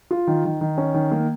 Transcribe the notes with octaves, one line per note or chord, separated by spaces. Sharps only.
F4
D#3
D#3
D#3
C#4
D#3
A#3